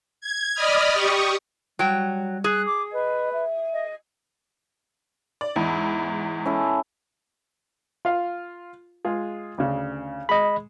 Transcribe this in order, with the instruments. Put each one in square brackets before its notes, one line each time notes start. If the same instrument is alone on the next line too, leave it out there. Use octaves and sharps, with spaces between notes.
[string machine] G#6
D5 D#5 B5 D#6 F6
G4 C#6 D#6
[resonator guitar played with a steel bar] F#3 G5 [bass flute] G3
[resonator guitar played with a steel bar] G#4 [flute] F#6
[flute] D6
[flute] B4 [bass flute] D#5
[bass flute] E5
[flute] D#5
[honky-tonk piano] D5
[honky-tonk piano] E2 G#2 [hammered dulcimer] E4
[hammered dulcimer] C#4 E4 A4
[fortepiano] F4 F5
G#3 F4 G#4
D2 C#3
[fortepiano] G#3 [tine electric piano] D#5 B5